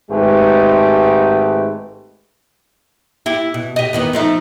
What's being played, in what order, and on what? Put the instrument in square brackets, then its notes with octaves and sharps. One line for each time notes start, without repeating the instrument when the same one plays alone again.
[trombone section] G#1 G#2 G#3 A3 G4 B4
[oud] E4 G4
B2
G4 D#5
E2 D#3 B3
F3 A3 D#4